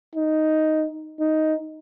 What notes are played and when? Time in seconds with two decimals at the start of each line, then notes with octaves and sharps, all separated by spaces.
0.15 D#4
1.20 D#4